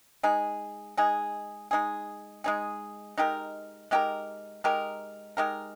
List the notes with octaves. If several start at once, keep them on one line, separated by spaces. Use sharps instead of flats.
G#3 D#4 G#4
G#3 D#4 G#4
G#3 D#4 G#4
G#3 D#4 G#4
G#3 D#4 G4 A#4
G#3 D#4 G4 A#4
G#3 D#4 G4 A#4
G#3 D#4 G4 A#4